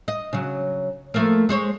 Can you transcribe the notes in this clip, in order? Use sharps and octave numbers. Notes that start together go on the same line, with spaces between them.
D#5
C#3 F#3
F3 A3 A#3
G#3 C5 C#5